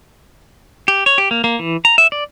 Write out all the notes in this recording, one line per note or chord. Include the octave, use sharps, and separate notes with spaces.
G4
C#5
G4
A#3
A#3
E3
A#5
E5
D5